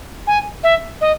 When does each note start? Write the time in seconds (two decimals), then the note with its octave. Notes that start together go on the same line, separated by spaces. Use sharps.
0.27 G#5
0.63 E5
1.01 D#5